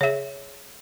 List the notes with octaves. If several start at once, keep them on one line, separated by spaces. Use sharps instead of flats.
C#3 G#4 C#5 E5